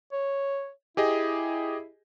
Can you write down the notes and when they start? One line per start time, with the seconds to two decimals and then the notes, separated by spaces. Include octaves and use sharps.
0.12 C#5
0.97 E4 G4 G#4 D#5